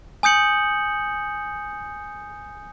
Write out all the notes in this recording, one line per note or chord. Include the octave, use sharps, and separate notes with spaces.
G#5 D#6 G6 C#7 F#7